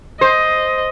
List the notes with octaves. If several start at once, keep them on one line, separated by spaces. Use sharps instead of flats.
C5 D#5